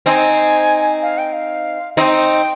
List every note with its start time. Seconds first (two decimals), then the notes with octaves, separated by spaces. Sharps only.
0.06 C4 D#4 G#5
1.02 F5
1.18 G5
1.33 F5
1.97 C4 D#4 G5